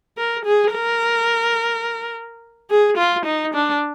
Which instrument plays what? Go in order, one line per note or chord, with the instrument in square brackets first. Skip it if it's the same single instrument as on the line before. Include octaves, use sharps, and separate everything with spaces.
[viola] A#4
G#4
A#4
G#4
F4
D#4
D4